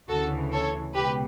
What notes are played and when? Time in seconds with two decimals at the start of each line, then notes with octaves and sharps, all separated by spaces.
0.08 D2 C#3 E3 F#4 A4
0.52 A4 C#5
0.94 C#2 B2 G4 B4